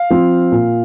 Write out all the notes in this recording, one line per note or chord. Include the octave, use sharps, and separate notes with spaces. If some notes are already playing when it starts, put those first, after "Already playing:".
Already playing: F5
F3 C4
A#2